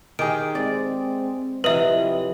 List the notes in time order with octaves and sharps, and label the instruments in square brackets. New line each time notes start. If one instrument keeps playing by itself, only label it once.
[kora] D#3 G4 G#4 [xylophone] D7
[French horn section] G#3 C4 [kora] D5
[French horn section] F2 C3 E3 [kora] F#3 D#5 [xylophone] B4 E5